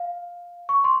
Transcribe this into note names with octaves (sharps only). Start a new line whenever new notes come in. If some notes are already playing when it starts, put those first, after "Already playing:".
Already playing: F5
C#6
C6